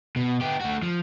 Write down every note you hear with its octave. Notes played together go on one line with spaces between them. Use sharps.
B2
B3 G4
A3 F#4
F3